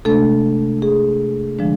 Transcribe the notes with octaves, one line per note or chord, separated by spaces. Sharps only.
C3 G#3 A3 D4 A4
G#4
D3 F3 G#3 D4